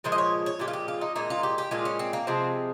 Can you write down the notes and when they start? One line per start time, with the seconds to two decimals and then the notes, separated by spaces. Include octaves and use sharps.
0.04 A#2 F3 G#3 C5
0.12 D#5
0.18 C#5
0.46 C#5
0.59 A#2 F3 G#3 G4
0.68 F4
0.73 G4
0.88 F4
1.01 D#4
1.16 A#2 G#3 D#4
1.30 F4
1.43 G4
1.58 G4
1.71 A#2 G#3 F4
1.85 C#4
1.99 C4
2.13 A#3
2.27 C3 F3 G#3 C4